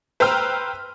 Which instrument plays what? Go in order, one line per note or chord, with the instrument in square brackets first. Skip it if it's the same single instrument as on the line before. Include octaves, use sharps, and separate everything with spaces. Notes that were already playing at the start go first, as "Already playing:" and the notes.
[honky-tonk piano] B4 C5 G5 A#5 E6 F6